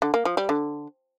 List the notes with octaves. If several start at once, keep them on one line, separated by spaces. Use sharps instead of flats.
D3
A#3
F3
G3
D3